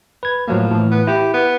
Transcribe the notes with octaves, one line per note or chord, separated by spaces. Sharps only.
B4 G#6
A2 F3 F#3 A#3
A2 E3
B3
E4 G4
B3